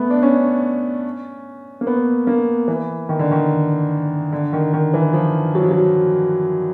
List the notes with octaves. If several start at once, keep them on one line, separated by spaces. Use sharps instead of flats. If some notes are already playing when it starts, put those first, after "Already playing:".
Already playing: A3 B3
D4
C#4
A#3
B3
A#3
E3
D#3
D3
D#3
D3
D#3
D#3
E3
F3
F#3
F3
F#3